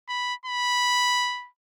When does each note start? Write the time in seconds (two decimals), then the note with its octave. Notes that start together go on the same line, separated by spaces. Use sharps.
0.08 B5
0.45 B5